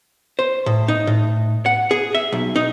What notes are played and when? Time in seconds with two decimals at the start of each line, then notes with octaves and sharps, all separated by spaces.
0.39 C5
0.66 A2
0.88 D#4
1.07 A2
1.66 F#5
1.91 G#4
2.15 E5
2.32 B1
2.56 D#4